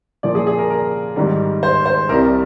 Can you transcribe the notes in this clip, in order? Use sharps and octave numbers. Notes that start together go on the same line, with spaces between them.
A#2 F3 A#3 D5
G#4
G#4
A#4
A#4
G#2 D#3 G3
C5
C5
C2 C3 G3 A#4